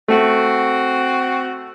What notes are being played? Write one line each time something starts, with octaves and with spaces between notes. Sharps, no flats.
A3 C4 F#4